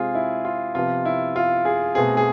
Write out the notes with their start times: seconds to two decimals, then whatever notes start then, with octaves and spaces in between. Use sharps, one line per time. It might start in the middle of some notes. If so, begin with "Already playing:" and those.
Already playing: C3 G#3 C4 F4 G#4
0.15 E4
0.45 F4
0.75 C3 F3 B3 F4
1.05 E4
1.36 F4
1.65 G#4
1.95 B2 A3 C4 G#4
2.17 G#4